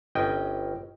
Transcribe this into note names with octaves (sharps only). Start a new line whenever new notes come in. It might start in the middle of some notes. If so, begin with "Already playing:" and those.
G1 C#4 D#5 G5 G#5